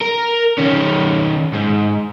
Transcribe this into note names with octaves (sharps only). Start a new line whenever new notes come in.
A#4
D#3 C#4
G#2